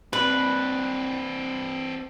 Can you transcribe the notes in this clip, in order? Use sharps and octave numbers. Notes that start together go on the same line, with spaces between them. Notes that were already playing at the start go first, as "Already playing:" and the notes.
C4 D4 B4